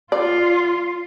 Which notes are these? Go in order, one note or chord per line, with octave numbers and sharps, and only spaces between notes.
F4 D5